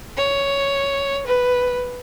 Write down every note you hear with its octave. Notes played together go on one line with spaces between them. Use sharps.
C#5
B4